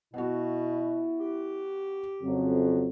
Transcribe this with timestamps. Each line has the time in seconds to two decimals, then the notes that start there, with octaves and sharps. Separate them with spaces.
0.14 B2 B3 E4 F#4
1.20 G4
2.22 F2 C#3 F#3